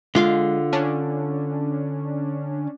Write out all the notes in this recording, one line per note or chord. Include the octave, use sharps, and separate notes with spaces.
D3 G#3 F4 F5
C#4 D4